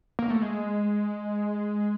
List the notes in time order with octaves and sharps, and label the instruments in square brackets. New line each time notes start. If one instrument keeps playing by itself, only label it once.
[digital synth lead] A#3
A3
G#3